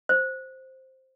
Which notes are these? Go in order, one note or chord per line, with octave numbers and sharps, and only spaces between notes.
C5